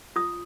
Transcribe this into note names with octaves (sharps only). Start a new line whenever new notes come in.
F4 D#6